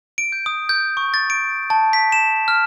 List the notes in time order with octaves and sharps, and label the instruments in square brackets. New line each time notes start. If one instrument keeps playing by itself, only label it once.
[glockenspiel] D7
G6
D#6
G6
C#6
A6
D7
A5
B6
E7
F6